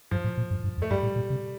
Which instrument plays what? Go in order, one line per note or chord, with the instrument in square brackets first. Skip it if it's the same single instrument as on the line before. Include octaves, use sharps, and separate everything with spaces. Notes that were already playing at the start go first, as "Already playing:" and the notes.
[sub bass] G2 [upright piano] F3
[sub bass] A2
A#2
G2
G2
F2
[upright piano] A3
[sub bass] G2 [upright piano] G3
[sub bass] A2
A#2
C3